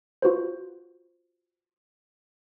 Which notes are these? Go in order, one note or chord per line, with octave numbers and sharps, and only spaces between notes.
F4 F#4 B4 C5